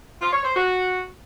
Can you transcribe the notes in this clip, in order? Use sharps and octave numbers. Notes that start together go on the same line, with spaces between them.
F4
C#5
C5
F#4